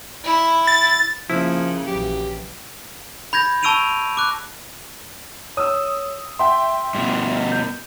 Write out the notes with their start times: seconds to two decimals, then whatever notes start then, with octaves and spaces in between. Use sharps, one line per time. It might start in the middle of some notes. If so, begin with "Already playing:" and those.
0.24 E4
0.67 A6
1.30 C#3 F3 A#3 E4
1.87 A#1 E3 F#3 G4
3.33 B5 G6 G#6 A#6
3.63 A5 C#6 E6 D7 D#7 F7
4.17 D6 F#6
5.57 C#5 D#6 E6
6.39 E5 G5 C6
6.95 G2 B2
7.52 G6